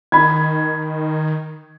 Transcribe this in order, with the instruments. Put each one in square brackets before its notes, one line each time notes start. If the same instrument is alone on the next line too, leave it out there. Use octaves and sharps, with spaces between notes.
[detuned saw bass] D#3 [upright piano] B5 G#6